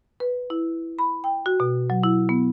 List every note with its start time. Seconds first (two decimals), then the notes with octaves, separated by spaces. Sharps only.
0.20 B4
0.50 E4
0.99 B5
1.24 G5
1.46 F#4
1.60 B2
1.90 F#3
2.04 E4
2.29 B3